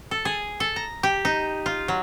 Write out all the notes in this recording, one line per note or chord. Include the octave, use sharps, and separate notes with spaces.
A4
G#4
A4
A#5
G4
D#4
F4
F#3